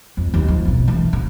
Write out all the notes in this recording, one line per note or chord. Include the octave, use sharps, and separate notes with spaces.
F2
D#2
F3
B1 C#3
D#3 E3
D3